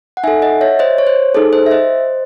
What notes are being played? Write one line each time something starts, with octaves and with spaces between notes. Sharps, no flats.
F#5
D#4 A4 E5 G#5
D#5 F#5
C#5 E5
C5 D#5
C#5
C5
D#4 G#4 A4
C5
E5
C5 D#5